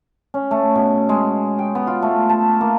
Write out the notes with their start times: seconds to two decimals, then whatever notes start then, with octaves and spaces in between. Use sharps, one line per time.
0.34 C#4
0.51 A3
0.75 B2
1.09 G#3
1.59 G5
1.75 B3
1.87 F4
2.02 A3
2.30 A5
2.61 A#3